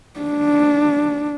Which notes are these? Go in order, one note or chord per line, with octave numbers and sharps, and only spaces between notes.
D4